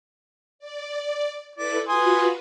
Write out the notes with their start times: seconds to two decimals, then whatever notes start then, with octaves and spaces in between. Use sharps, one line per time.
0.59 D5
1.56 E4 A4 B4 D5
1.88 F4 F#4 B4 G#5 C6 D#6